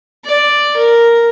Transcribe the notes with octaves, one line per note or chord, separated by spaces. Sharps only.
D5
A#4